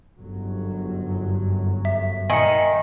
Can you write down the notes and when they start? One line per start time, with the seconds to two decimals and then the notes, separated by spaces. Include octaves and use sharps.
0.17 G1 F#2 F#3
1.85 E5
2.30 D#3 G#5 C#7